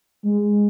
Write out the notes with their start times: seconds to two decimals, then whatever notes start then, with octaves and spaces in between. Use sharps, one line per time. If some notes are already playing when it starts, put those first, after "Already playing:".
0.24 G#3